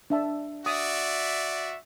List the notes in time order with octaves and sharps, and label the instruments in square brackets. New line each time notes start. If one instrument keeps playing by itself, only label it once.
[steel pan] D4 E5 A5
[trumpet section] F#4 D5 E5 [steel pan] D#6